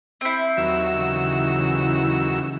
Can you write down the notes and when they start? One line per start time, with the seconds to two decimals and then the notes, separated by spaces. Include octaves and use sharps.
0.21 C4 E4
0.57 D#2 F#3 E6
0.91 C#3 E3